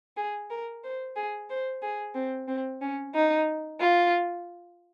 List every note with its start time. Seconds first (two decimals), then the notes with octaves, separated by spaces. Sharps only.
0.17 G#4
0.50 A#4
0.84 C5
1.16 G#4
1.50 C5
1.82 G#4
2.15 C4
2.48 C4
2.82 C#4
3.15 D#4
3.80 F4